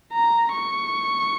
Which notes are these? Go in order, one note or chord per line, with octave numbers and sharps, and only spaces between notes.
A#5
C#6